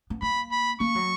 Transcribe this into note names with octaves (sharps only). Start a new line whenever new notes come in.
B3
A#3 B5
B5
A#3 C#6
F#3